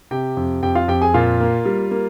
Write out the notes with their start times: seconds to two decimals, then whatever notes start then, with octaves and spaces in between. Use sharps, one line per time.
0.11 C3 G4 G5
0.37 F2
0.63 F2 G4 G5
0.75 F4 F5
0.88 F2 G4 G5
1.02 G#4 G#5
1.14 A#2 F4 F5
1.40 A#3
1.66 G3
1.91 A#3